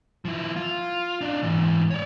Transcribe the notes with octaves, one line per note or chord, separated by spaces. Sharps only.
F3 E4
F4
D4 D#4
G#2 E3
C#5 D5